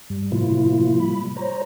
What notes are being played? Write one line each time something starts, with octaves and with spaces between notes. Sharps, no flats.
G2 G3
A2 C3 F3 A#3 E4 F4
G3 B5
C5 C#5 A#5